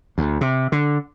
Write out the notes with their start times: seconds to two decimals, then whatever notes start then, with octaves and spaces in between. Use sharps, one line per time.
0.18 D2
0.41 C3
0.72 D3